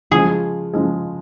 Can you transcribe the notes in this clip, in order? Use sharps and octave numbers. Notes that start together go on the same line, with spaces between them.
C#3 F3 G#3 G#4
C#3 F3 G#3